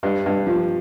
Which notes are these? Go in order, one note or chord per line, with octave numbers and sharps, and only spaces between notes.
G2
G2
F3